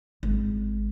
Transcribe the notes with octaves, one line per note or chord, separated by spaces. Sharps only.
G#1